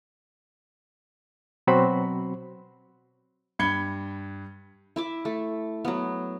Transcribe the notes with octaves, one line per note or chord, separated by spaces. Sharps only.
B2 F#3 C4 F#4 C5 B5
G2 B5 G#6 C#7 G7
E4 E5 D6
A3
F#3 B3